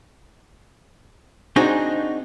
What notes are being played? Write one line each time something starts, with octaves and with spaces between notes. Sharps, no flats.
C4 D4 D#4 F#4 G#4 C5